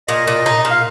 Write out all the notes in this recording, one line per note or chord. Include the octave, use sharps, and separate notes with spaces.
A#2 D#5
A#2
D#4
A#2
F5